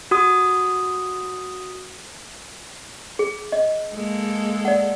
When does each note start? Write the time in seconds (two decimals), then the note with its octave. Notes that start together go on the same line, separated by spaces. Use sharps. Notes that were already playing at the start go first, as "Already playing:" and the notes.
0.11 F#4 D#6
3.19 G#4
3.52 D#5
3.94 G#3 A#3 A4
4.65 D5 F#5